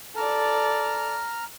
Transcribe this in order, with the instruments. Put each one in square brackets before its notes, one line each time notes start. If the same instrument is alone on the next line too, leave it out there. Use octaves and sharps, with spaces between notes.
[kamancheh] A4 D5 [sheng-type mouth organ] A#5 F6